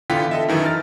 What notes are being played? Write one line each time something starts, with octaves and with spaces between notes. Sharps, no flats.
D3 E3 B3 F4 G5 B6
A4 D#5 E5
F#2 D#3 E3
A#5 F6 A6